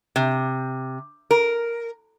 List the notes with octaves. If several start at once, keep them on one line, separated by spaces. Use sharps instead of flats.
C3
A#4